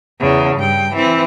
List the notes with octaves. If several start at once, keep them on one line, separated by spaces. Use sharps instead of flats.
E2 C#3
G2 G5
E3 C4